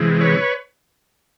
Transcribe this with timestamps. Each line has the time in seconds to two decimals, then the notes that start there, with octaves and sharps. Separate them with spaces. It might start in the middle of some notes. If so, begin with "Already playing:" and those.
Already playing: C3 E3 G#3
0.21 B4 C#5